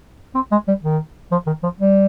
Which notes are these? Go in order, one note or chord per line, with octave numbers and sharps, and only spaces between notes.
C4
G#3
G3
D#3
F3
D#3
F3
G3